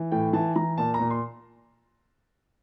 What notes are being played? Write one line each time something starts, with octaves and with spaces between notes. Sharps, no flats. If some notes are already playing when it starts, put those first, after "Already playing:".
Already playing: E3
A2 G5
E3 A5
E3 A#5
A#2 A5
A#5
A#2
C6